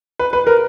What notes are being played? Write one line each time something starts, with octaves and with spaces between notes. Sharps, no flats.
B4
B4
A#4